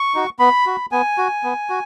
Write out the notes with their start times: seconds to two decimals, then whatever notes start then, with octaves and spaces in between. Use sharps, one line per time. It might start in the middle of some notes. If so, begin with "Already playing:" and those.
Already playing: C#6
0.14 D#4 F#4
0.39 B3 B5
0.66 F#4
0.92 B3 G#5
1.18 F#4
1.44 B3
1.70 F#4